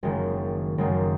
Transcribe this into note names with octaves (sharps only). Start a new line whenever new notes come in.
F#1 F#2 D#3 G#3
F#1 F#2 D#3 G#3